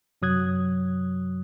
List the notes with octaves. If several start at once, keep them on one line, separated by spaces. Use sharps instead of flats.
F#2 C3 F#3 D#6 F#6 G#6